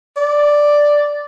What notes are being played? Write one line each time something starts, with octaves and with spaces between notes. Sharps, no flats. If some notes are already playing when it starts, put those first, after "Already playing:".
D5